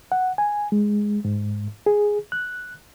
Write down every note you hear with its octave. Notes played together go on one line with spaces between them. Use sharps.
F#5
G#5
G#3
G#2
G#4
F#6